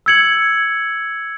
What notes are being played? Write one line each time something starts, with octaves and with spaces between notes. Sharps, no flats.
E6 G#6 C#7 F#7